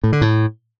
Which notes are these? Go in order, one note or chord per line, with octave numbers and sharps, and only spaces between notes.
A2
D3
A2